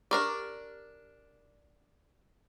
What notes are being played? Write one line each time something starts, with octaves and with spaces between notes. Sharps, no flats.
D4 G4 A#4 D5